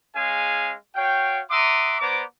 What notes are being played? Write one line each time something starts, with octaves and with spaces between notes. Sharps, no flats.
G#3 C#4 G#4 F5 G#5
F#4 C#5 F5 G5
E5 F#5 A#5 C6 D6 D#6
B3 C5 D5 A#5 D6